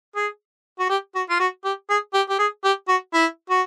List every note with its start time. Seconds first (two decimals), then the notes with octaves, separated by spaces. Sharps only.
0.16 G#4
0.79 F#4
0.89 G4
1.15 F#4
1.29 F4
1.40 F#4
1.65 G4
1.90 G#4
2.14 G4
2.29 G4
2.39 G#4
2.64 G4
2.88 F#4
3.14 E4
3.50 F#4